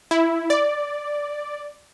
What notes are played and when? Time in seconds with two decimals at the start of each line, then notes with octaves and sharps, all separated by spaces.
0.11 E4
0.50 D5